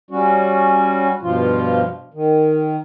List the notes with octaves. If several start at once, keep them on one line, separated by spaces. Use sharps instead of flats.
G3 C#4 F#4
G2 B2 F3 F4
D#3